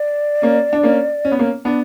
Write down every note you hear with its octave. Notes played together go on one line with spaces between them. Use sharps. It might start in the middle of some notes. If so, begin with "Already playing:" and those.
Already playing: D5
A#3 C#4
D4
A#3 C#4
C#4
B3
A#3 C#4
B3 D4